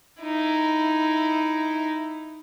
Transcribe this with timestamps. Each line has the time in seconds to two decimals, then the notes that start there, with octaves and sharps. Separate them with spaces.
0.22 D#4 E4